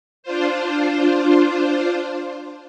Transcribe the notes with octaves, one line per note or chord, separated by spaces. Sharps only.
D4 F4 C5